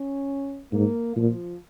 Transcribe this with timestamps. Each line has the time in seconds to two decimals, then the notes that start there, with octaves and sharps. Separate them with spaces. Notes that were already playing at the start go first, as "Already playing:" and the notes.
Already playing: C#4
0.72 G#2 A#3
1.16 A#2 F3